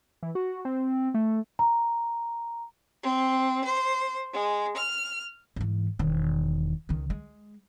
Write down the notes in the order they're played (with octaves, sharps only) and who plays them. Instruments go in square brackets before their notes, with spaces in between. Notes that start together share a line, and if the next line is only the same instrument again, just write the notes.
[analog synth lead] E3
F#4
C4
A3
[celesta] A#5
[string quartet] C4
C5
G#3
F6
[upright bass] G#2 E3
E1 D#3
C#2 D#3
G#3